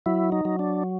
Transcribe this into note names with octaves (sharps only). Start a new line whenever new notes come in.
F#3 E4
D#4
F#3
D4